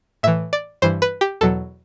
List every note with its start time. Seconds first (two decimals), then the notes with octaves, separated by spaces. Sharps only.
0.23 A2 E3 E5
0.53 D5
0.82 G2 E3 C5
1.02 B4
1.21 G4
1.41 E2 B2 F#3 A4